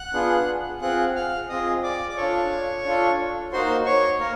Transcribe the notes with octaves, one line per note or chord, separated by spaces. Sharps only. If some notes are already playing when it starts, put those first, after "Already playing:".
Already playing: F#5 F#6
B3 D4 F4 G#4
C4 F4 G#4 F#5 F#6
F5 F6
C4 F4 G#4 D#5 D#6
D5 D6
D6
D4 F4 A4 C#5 C#6
D4 F4 A4
A#3 D#4 F#4 C5 C6
C#5 C#6
A#3 A#4